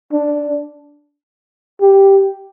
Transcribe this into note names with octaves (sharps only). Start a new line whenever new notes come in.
D4
G4